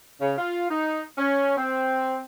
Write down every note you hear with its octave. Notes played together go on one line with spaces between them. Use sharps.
C#3
F4
D#4
C#4
C4